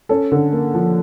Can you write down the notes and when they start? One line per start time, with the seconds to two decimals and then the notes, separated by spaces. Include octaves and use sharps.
0.09 C#4 A4
0.32 D3
0.53 A#3
0.75 F3